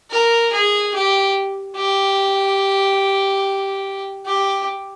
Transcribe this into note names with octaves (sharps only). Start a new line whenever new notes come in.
A#4
G#4
G4
G4
G4